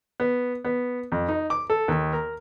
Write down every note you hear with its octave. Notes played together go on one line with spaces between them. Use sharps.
B3
B3
F2
D#4
D6
A4
D#2
A#4